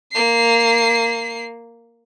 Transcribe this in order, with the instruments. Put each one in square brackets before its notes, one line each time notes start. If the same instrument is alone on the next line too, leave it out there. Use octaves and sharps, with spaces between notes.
[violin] A#3 C7